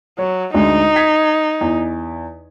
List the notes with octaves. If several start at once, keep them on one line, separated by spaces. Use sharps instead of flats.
F#3 C#5
D2 G#3 D4 D#4
G#6 B6
E2